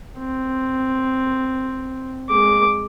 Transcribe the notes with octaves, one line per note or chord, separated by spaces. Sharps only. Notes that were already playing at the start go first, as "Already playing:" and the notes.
C4
G#3 D6